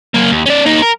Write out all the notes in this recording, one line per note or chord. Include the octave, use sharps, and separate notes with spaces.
F#3 A#3
D#2
C#4 D5
A#3 D#4
A#4